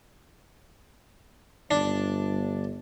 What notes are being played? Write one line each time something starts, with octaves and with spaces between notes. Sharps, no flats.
G1 D4